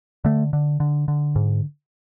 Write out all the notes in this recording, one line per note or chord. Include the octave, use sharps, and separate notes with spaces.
D3 A3
D3
D3
D3
G#2